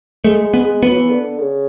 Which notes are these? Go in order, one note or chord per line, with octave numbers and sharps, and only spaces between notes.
G#3 A3
G#3
B3
G#3
E3 B3
F#3
E3
D3
C#3